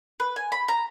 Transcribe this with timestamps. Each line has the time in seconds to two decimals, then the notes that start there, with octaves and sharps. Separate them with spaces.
0.20 B4
0.36 G#5
0.52 B5
0.68 A#5